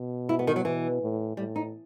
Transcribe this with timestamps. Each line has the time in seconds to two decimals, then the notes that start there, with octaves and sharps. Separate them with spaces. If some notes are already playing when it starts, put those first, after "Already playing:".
Already playing: B2
0.29 E4
0.39 B3
0.47 D#3
0.56 F#3
0.65 B2 E3
1.01 A2
1.37 A2 G3
1.56 D#4